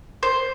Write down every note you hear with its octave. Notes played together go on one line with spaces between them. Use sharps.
C5